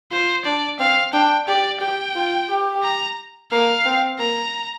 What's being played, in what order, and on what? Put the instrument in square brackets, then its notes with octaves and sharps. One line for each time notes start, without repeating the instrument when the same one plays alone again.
[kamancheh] F4 [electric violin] C5
[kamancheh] D4 [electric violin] D5
[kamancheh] C4 [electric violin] F5
[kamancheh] D4 [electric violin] G5
[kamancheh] G4 [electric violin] D5
[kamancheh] G4 [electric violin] G5
[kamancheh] F4
G4
[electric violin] A#5
[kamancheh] A#3 [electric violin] F5
[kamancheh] C4
[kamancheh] A#3 [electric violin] A#5